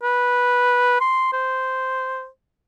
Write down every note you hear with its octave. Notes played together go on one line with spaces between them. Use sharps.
B4
C6
C5